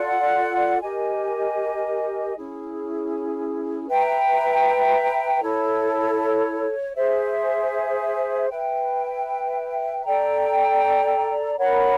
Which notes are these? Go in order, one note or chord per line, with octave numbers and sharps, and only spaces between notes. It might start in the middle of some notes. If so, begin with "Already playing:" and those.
Already playing: F4 A4 D5 F#5
G4 A#4 D#5 G#5
C#4 E4 G#4
B4 E5 G5 A#5
E4 A4 C#5
G#4 C5 E5
B4 E5 G5
A4 D5 G5 A#5
A#4 C#5 F#5 B5